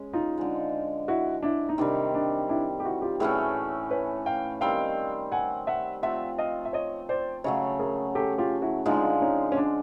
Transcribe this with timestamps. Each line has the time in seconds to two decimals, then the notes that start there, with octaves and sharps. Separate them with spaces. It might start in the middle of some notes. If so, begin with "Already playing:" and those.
Already playing: G#3 C#4
0.13 D#4 F4
0.37 D3 F3 G#3
1.08 E4 F#4
1.43 D4 E4
1.69 D#4
1.78 C3 D#3 G3 D4
2.14 D4
2.49 D4 E4
2.80 G4
2.84 E4 F#4
3.02 F4 G4
3.19 A2 E3 A3 C#4 F#4 G#4
3.91 B4 C#5
4.26 F5 G5
4.61 D#3 G3 C4 F5 G5
5.32 F#5 G#5
5.67 E5 F#5
6.03 F3 A3 C4 F4 E5 F#5
6.38 D#5 F5
6.65 E5
6.73 C#5 D#5
7.09 C5 D5
7.44 C#3 F#3 A3 C#5 D#5
7.80 G#4 A#4
8.15 G4 A4
8.38 F4 G4
8.62 E4 F#4
8.86 D3 F3 G#3 D#4 F4
9.21 C#4 D#4
9.52 C#4
9.57 D4